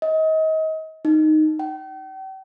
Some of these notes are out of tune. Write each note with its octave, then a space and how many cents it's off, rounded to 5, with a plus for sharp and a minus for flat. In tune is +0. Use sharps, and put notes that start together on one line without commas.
D#5 +30
D#4 -5
G5 -40